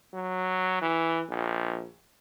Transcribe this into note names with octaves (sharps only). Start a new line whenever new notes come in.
F#3
E3
A#1